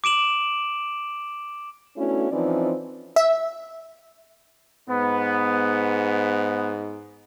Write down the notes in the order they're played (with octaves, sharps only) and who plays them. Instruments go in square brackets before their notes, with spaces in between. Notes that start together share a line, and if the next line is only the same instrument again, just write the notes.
[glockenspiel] D6 D7 E7 F#7
[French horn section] A3 B3 C#4 D4 E4 F#4
E3 F3 C4 C#4 D#4 D5
[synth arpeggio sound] E5
[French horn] G#2 [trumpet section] B3